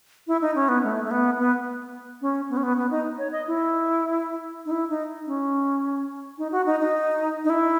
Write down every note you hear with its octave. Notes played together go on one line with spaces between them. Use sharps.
E4
D#4
C#4
B3
A3
A3
B3
B3
C#4
B3
C#4
B3
B3
D#4
C#5
D#5
E4
D#4
E4
D#4
C#4
D#4
F#4
D#4
D#4
D#4
E4